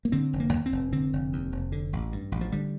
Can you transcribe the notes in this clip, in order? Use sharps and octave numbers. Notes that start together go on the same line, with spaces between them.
A#3
D3 C4
F1
A#3
D#2
C4
F1
D3 C4
F1
D#2
F1
D3
A1
G2
A1
F3
D3 G3